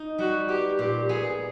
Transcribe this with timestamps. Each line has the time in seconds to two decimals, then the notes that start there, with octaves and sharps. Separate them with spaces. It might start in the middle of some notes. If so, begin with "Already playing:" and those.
Already playing: D#4
0.18 G3 F#4
0.49 B3 G4
0.79 A#2 G4
1.09 B3 G#4